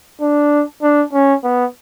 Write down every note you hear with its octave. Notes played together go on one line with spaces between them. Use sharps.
D4
D4
C#4
B3